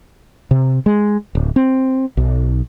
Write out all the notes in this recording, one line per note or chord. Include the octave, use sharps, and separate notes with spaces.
C3
G#3
D1
C4
B1